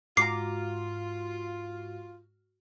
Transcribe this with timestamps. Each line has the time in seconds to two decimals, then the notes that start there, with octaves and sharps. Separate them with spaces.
0.17 G#2 F4 F#4 A#5 D6 F6 C7